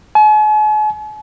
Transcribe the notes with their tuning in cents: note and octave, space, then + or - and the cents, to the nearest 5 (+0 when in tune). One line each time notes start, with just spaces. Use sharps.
G#5 +45